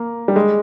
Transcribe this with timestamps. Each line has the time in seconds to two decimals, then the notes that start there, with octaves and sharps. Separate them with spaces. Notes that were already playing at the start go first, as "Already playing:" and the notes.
Already playing: A#3
0.28 G3
0.36 G#3